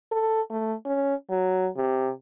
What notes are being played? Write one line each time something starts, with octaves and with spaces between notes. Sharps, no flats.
A4
A3
C#4
F#3
C3